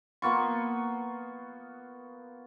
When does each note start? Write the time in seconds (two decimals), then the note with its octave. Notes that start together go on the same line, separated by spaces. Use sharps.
0.22 A#3 B3 F4 C#6